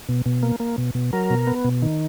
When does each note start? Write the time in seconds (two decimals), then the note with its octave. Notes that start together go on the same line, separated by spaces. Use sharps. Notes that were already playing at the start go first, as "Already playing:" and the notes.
0.09 B2
0.26 B2
0.43 A#3
0.60 A#3
0.78 B2
0.95 B2
1.13 F#3 A#4
1.30 B2
1.47 B3
1.65 B2
1.82 D#3